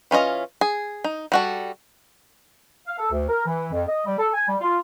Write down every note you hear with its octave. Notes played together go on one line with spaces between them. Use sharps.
E3 C#4 F4 D#5
G#4
D#4
G3 F#4 A4
F5
A4
D2
A#4
E3
F2
D#5
G3
A4
G#5
G3
F4